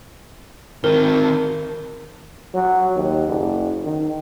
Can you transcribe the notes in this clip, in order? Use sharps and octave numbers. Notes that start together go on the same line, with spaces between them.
D#3 C4 A#4
F#3
D#2
F#1
D#3